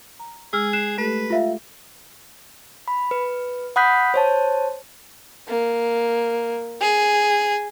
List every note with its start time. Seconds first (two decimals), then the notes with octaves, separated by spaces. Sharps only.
0.19 A#5
0.53 G#3 G#4 E6 F6
0.73 F#6 C7 E7
0.98 A3 G4 A4 B4
1.30 F4 E5 F5
2.88 B5
3.11 B4
3.76 F#5 B5 D#6 F#6 G6 B6
4.14 C5 C#5 A5
5.47 A#3
6.81 G#4